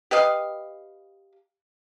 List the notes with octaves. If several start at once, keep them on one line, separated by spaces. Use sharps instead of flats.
G4 B4 D#5 F5